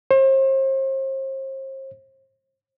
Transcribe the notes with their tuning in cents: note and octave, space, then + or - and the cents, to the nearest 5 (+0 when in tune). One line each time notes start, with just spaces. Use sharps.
C5 +40